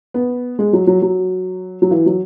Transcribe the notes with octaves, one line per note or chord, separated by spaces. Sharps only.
B3
G#3
F#3
F#3
F#3
F#3
E3
F#3